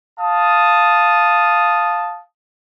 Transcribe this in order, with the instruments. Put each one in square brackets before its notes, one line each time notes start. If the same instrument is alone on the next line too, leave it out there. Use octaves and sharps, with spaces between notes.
[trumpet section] F5 A5 D#6